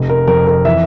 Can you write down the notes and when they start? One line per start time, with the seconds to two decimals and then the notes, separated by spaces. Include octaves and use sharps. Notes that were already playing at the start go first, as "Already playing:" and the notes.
Already playing: F1
0.10 A#4
0.28 F2 A#4
0.47 A#4
0.65 E3 E5